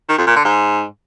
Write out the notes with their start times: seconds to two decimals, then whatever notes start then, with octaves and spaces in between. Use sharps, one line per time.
0.09 D#3
0.18 F2
0.27 A#2
0.36 D3
0.45 G#2